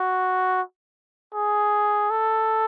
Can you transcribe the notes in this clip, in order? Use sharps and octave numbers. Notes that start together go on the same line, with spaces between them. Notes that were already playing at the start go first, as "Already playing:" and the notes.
Already playing: F#4
G#4
A4